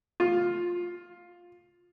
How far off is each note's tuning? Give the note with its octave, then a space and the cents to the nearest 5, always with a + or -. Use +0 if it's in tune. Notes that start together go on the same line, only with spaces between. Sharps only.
F4 +10